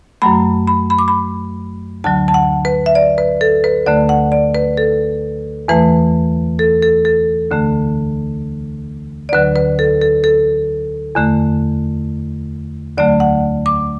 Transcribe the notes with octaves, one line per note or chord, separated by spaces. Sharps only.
F#2 F#3 A3 B5
B5
B5
D6
B5
D2 D3 F#3 A5
A5
F#5
B4
E5
D5
B4
A4
B4
D2 D3 A3 D5
F#5
D5
B4
A4
E2 E3 A3 B4
A4
A4
A4
D2 D3 A3
D5
D2 D3 F#3 B4
B4
A4
A4
A4
E2 D3 A3
D2 D3 F#3 A3 D5
F#5
D6